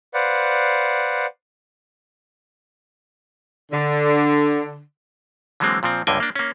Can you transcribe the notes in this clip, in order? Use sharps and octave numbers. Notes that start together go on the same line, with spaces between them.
B4 C5 D5 F5 F#5
D3
D3 E3 F#3 G#3 A#3 C4
A#2 F3 C4
C#2 G2 D3 A#3 G5 G#5
A#3 D4
A#3 C#4